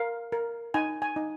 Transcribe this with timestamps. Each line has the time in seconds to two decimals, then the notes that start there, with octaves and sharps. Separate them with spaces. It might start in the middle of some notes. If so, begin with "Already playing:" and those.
Already playing: A#4 F5
0.32 A#4
0.74 D#4 G#5
1.02 G#5
1.16 D#4